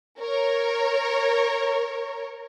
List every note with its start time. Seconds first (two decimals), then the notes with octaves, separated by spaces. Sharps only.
0.19 A#4 C#5